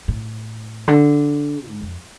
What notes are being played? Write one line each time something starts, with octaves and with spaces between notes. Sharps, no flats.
A2
D3
G#2
F2